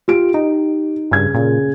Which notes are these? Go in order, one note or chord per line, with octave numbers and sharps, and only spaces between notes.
F4 G4 D7
D#4 G4
G2 C#3 G#6
A#2 C#3